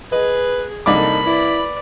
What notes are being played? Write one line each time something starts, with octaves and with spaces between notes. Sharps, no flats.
G#4 B4 D#5
C2 A#3 D4 D#4 A4 B5 D6
E4 B4 D5